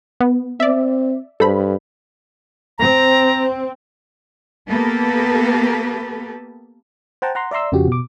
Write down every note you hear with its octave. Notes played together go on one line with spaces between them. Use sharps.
B3
C4 D5 E5
G2 A4 C5 B5
C4 A#5
A#3 B3 G4 A4 B4
C5 F#5 G5 A5 A#5
F#5 A#5 C6
D5 E5 A#5 C6 E6
F2 C#3 F3 F#4 G4
B2 D6